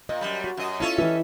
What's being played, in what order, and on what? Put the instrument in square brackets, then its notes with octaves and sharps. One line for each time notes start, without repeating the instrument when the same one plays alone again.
[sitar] A#2 [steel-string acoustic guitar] D#5
[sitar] F#2 A2 G3
[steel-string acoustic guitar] F#4
[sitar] F#2 D#5
[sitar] C#4 A4 C#5 [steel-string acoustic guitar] E4 F4 E5
[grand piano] E3 [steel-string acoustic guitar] G4 D#5 E5